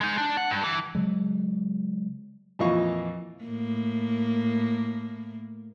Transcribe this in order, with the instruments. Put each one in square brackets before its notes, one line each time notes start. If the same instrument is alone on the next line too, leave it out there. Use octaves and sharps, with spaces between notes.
[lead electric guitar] G#3 D#4
D4
F#5
G2
E3
[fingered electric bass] C#3 F#3 G#3
[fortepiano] F2 A#2 E3 D#5 F5 C#6
[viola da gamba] A2 A#3